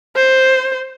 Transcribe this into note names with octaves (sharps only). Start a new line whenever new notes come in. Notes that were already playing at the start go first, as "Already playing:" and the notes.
C5